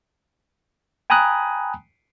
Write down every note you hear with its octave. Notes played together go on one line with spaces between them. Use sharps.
G5 G#5 A#5 B5 D#6 F#6